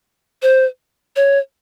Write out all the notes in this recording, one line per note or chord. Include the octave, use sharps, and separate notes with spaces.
C5
C#5